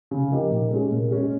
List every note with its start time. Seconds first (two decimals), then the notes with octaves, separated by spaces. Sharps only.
0.11 C#3
0.31 F3 A#3 D#4 G4
0.51 A#2
0.71 G#3 C#4 G#4
0.91 A#2
1.11 G#3 C#4 G#4